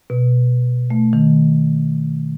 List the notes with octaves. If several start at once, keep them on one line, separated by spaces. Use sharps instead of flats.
B2
A3
D#3